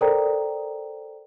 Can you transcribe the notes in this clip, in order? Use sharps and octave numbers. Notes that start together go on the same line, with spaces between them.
A4 A#4 C5 D5 G5 A#5